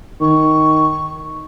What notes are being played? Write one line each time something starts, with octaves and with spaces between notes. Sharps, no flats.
D#3 C#6